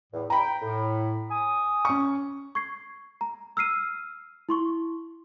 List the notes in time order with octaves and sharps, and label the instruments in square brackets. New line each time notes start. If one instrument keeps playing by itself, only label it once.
[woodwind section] E2 A2
[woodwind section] G5 [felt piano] A#5 B5
[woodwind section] A2
G#5 D#6
[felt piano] C#4 C#6
[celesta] C#6 G#6 C7
A#5
E6 F6 C7 D#7
E4 C6 C#6